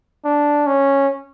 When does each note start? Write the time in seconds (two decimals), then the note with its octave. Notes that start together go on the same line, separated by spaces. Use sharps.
0.25 D4
0.67 C#4